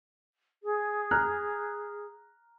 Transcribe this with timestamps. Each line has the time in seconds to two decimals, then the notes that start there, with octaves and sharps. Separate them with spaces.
0.63 G#4
1.11 A#5 F6 F#6